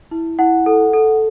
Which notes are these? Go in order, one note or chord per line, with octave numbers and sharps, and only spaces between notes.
E4
E4 F#5
A4
A4